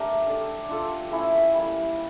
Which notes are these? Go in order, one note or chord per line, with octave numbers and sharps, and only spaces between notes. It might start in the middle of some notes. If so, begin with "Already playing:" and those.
Already playing: A3 D4 G4 A#4
D4 A4 D5
D4 F4 A4
A3 C#4 E4
G3 A#3 E4